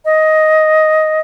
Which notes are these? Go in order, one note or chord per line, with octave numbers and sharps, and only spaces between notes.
D#5